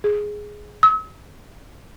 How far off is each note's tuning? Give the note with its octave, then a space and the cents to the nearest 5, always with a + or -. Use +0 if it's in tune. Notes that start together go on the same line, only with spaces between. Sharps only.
G#4 +5
E6 -45